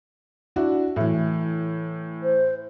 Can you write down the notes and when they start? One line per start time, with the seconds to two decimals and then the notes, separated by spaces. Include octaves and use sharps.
0.56 D4 E4 F#4
0.96 A2 E3
2.23 C5